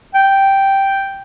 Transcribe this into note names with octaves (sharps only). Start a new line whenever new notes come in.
G5